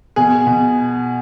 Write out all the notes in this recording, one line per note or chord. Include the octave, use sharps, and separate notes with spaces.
B2 G#4
B2